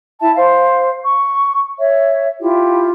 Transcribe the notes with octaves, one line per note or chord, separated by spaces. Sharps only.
E4 E5 A5
C5 F5
C#6
C#5 E5
E4 F4 G4